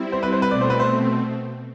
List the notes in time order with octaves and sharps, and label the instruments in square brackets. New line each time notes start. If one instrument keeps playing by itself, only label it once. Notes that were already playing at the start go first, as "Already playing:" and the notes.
Already playing: [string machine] G3 C4 E4
[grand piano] C5
B4
C5
B4
[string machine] B2 A3 C4 [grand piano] D5
[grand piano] C5
B4
C5